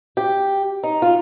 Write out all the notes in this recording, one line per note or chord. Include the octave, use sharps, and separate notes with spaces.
G4
D#4
F4